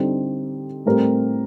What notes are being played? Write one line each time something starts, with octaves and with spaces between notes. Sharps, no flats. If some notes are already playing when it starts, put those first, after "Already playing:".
Already playing: D3 G3 C4 D#4 G4
A2 G3 C4 G4 A#4